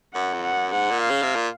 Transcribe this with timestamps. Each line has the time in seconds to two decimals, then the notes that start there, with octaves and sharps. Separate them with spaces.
0.14 F#2 F#5
0.33 F2
0.44 F#5
0.53 F#2
0.72 G#2 F#5
0.91 A#2
1.01 F5
1.10 C#3
1.22 C3
1.36 A#2